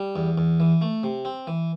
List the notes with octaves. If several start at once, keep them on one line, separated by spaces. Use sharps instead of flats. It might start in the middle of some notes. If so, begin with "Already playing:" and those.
Already playing: G3
E2
E2
E3
A3
C3
C4
E3